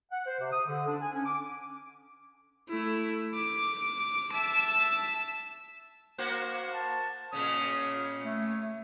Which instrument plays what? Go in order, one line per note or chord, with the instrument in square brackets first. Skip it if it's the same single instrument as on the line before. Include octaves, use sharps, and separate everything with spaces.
[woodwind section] F#5
C5
C3
D#6
D3
D4
G#5
C#4
D6
[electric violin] A3 E4
D6
E5 A5
[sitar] A#3 F#4 C5
[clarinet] A5
[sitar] A#2 C#3 C#4 [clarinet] D#6
[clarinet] A3